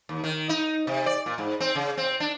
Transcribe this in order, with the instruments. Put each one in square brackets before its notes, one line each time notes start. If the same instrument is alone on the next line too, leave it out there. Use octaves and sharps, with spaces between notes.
[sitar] D#2
D#3
D#4
C3
D5
A#2
G#2
C4
C#3
C4
D4